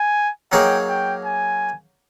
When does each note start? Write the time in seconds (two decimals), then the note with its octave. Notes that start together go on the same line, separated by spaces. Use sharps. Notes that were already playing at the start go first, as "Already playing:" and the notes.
Already playing: G#5
0.52 F#3 A#3 D#4 G#4 C#5 G5
0.89 G5
1.25 G#5